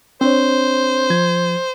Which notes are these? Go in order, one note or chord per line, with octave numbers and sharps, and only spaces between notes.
C4 D4 C5 C#5
F3 G#6